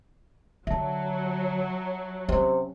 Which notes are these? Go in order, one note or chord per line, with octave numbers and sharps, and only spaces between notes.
D3 F#3 E5 A5
C3 C#4